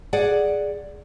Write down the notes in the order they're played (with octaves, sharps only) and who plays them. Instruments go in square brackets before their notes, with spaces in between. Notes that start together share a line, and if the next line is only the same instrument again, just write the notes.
[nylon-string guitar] G#4 D5 F#5